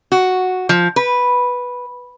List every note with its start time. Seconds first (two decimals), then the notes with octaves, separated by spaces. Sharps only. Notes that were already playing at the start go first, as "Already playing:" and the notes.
0.12 F#4
0.69 F3
0.96 B4